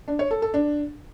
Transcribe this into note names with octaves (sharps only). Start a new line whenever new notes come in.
D4
C#5
A4
A4
D4